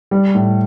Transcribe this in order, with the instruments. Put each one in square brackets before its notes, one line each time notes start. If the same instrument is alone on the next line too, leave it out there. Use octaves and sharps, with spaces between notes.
[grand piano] G3
A2